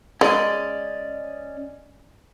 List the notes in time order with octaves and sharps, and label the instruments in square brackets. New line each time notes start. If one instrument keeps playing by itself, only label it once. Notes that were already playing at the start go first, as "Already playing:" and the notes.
[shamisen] G#3 [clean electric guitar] C#4 D5 D#5